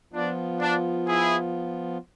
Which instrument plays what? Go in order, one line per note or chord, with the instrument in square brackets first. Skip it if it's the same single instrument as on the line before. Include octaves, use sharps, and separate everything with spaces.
[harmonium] F3 B3 F4 [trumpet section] D4
[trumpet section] D4
E4 G#4